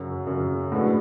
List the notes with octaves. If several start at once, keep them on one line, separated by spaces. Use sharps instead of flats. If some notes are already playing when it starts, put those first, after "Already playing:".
Already playing: F#2 C#3 F#3
F#2 C#3 F#3
A2 G#3 B3 D4 F#4